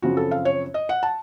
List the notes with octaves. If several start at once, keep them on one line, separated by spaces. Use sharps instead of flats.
F#2 C#3 F3 C4 F#4
A4
F5
C#5
D#5
F#5
A5